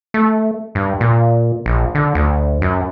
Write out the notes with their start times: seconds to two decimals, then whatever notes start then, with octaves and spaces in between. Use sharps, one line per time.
0.14 A3
0.75 G2
1.01 A#2
1.66 A#1
1.95 D3
2.15 D2
2.62 F#2